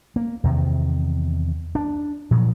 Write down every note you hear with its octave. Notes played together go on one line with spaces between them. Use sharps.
A#3
E2 C3 D#3
D4
A#2 F3 F#3